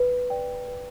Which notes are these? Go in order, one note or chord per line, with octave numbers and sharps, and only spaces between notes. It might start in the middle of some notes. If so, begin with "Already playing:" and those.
Already playing: B4
D5 G5
B4